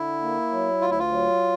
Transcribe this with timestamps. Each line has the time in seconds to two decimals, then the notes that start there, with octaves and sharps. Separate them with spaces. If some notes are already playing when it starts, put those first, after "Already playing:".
Already playing: D3 E4
0.21 A#3
0.51 F#3
0.81 D2 F4
0.90 E4
0.99 F4
1.11 F#3